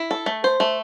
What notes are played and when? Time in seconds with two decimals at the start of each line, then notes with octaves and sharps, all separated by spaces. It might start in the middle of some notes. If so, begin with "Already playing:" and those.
Already playing: E4
0.11 A4
0.26 A3
0.44 C5
0.60 A3